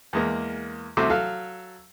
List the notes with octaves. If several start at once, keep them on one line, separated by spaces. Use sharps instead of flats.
E2 G#3 A#3
C2 C3 A3 F#4 C5 D6
F#3 A4 F5